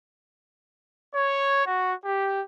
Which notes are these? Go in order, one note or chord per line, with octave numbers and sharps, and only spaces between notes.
C#5
F#4
G4